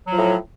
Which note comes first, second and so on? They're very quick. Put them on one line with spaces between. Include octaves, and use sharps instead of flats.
F#3 F3 A2